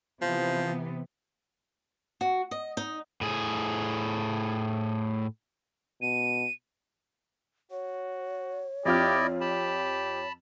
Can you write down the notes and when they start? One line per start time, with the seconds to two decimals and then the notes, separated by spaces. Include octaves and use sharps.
0.21 C3 E3 F3 B3
2.21 F#4
2.51 D#5
2.77 D#4
3.21 A2 G#4
6.02 B2 D#7
7.71 F#4 C#5
8.85 F2 E4 F4 G4 D5 D#5 F6
9.41 G4 A5 B5